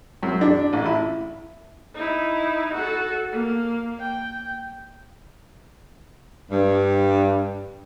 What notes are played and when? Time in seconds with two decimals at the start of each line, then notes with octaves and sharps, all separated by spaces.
0.23 F#2
0.41 D4
0.73 A1
0.86 E4
1.95 D#4 E4
2.74 F#4 A4
3.32 A#3
4.00 G5
6.52 G2